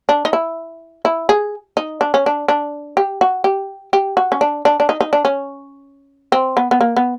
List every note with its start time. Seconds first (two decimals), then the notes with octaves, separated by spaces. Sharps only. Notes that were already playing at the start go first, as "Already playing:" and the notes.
0.09 D4
0.25 D#4
0.33 E4
1.05 E4
1.29 G#4
1.77 D#4
2.01 D4
2.14 C#4
2.26 D4
2.48 D4
2.97 G4
3.21 F#4
3.44 G4
3.93 G4
4.17 F#4
4.32 C#4
4.41 D4
4.65 D4
4.80 D4
4.89 D#4
5.01 D#4
5.13 D4
5.25 C#4
6.32 C4
6.57 B3
6.71 B3
6.81 A#3
6.97 B3